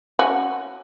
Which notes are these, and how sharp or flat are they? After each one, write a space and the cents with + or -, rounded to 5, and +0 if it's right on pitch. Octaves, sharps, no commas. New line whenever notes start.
C#4 +0 F#4 +0